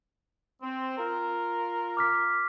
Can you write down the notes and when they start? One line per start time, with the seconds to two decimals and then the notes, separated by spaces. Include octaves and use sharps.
0.62 C4
0.98 F4 A#4
1.97 D6 F6 B6